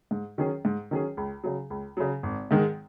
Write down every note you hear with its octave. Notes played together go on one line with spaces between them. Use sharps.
G#2
D#3 F#3 C#4 G#4
G#2
D#3 F#3 C#4 G#4
C#2
C#3 F#3
C#2
C#3 F#3
G#1
G#2 D#3 G#3